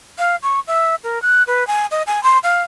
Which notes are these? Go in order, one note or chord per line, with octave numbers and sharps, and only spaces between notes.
F5
C#6
E5
A#4
F#6
B4
G#5
D#5
G#5
C6
F5